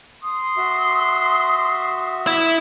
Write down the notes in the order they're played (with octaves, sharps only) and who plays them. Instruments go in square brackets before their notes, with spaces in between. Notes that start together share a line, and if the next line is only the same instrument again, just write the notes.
[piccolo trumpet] C6 [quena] D#6
[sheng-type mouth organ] F#4 E5
[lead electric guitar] E4